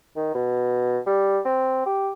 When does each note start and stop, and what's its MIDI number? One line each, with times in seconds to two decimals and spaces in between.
0.16 0.32 51
0.34 0.98 47
1.07 1.39 55
1.45 1.84 60
1.86 2.10 67